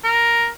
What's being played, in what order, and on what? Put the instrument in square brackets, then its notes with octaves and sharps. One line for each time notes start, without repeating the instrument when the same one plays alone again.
[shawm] A#4